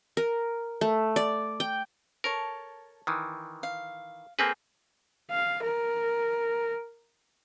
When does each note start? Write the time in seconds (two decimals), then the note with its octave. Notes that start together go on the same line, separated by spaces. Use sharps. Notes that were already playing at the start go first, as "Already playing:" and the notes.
0.17 A#4
0.81 A3
1.16 D5
1.60 G5
2.24 A4 A#4 C#5 A5
3.07 D#3 E3
3.63 F5
4.39 A#3 C4 G#4 A4 B4 G5
5.30 F5
5.63 A#4